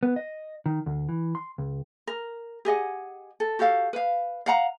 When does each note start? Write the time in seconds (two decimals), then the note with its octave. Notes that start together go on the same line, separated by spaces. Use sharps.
0.03 B3
0.16 D#5
0.66 D#3
0.86 D2
1.09 E3
1.35 C6
1.58 C#2
2.07 A#4
2.65 G4 G#4 D#5 F#5
3.40 A4
3.59 F#4 G4 A4 F5
3.93 B4 F5
4.46 F5 F#5 A#5